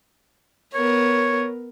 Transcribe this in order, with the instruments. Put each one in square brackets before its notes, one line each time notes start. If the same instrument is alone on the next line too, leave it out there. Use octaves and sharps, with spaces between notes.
[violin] B3 A#4 [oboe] C#5